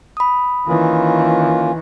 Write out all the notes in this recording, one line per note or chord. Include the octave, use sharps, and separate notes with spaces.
B5 D#6
D#3 E3 A#3 C#4 F4